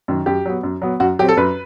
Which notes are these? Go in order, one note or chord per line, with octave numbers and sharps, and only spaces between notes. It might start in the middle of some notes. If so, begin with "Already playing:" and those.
F#2 D#3
F#2 G4
F#3 B3
F#2
F#3 B3
F#2 F#4
F#3 C4 G4
A4
F#2 B4